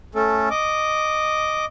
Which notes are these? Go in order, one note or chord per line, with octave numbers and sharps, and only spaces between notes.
A3 C#4 A4
D#5 D6